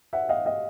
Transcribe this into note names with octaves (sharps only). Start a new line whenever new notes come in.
E5 F#5
D#5 F5
D#5 F5